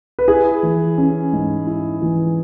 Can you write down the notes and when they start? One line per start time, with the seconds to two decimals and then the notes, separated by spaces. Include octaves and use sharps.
0.19 B4
0.28 E4 G#4
0.63 E3
0.98 C#4
1.33 G#2
1.67 E4
2.02 E3